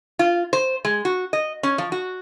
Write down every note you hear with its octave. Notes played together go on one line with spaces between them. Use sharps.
F4
C5
G#3
F#4
D#5
C#4
F3
F#4